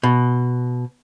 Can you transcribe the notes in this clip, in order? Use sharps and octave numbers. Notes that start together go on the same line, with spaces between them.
B2